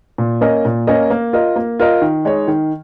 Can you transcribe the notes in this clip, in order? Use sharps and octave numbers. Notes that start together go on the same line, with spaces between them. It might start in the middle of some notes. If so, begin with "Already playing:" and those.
A#2
A#3 C#4 A#4 D#5
A#2
A#3 C#4 A#4 D#5
A#3
F4 A#4 D#5
A#3
F4 A#4 D#5
D#3
G#3 D#4 C#5
D#3